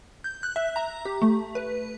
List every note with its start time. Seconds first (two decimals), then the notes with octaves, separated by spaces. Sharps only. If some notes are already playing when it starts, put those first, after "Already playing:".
0.24 G6
0.43 F#6
0.56 E5
0.76 A#5
1.05 G4
1.22 A3
1.55 B4